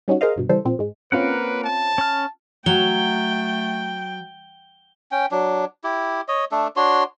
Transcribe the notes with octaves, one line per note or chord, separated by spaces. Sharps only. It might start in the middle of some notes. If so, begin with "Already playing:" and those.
G3 C#4 D#4 F#4
G#4 A#4 C5 D#5 F5
G1 G2 B2
C#3 E3 G3 A4 C5
A#2 F3 C4
G#2 G#3
A#3 C4 C#4 F4 A#4 B4 F#5
A5
C#4 F6
F#3 A3 G5 G7
C#4 G5
F#3 D4
E4 G4
C#5 D#5
A3 D4 A4
D4 F#4 C#5 C6